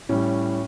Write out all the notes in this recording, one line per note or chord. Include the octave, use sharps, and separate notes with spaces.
A2 G3 C#4